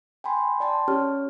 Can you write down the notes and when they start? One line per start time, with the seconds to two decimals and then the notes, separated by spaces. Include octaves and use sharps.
0.24 G5 G#5 B5 C6
0.60 D5 G5 A5 C6
0.88 C#4 G4 C#5 F6